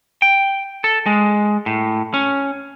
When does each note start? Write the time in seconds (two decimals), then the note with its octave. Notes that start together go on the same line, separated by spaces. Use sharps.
0.22 G5
0.84 A4
1.06 G#3
1.66 A2
2.14 C#4